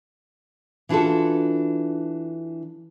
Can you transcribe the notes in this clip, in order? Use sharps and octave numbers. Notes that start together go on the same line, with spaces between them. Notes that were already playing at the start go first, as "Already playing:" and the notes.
E3 D4 F4 F#4 A4